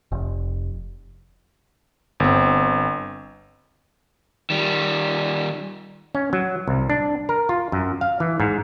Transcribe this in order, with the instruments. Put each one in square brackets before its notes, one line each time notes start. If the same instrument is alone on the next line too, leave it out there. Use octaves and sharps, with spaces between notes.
[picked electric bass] F1
[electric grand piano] G1 C4
[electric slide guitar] D#3 G3
[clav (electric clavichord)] C#4
F#3
C2
D4
A#4
F4
F#2
F5
E3
G#2